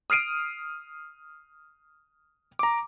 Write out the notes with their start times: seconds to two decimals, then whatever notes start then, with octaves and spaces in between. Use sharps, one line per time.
0.10 D#6 F6 C7 D7 D#7
2.59 A#5 D6